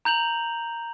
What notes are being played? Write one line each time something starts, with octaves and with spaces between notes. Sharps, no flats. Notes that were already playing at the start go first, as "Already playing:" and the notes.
A#5 G6 F7 F#7